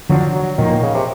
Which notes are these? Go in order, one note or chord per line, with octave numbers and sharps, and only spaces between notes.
D3 F3 F#3 A#3 D4
F#3
A#2 D#3 F3 A#3
D#3
C#3
C3